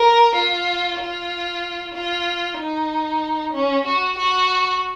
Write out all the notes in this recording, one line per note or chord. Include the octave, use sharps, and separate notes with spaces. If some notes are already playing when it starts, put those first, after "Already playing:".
Already playing: A#4
F4
F4
F4
D#4
C#4
F#4
F#4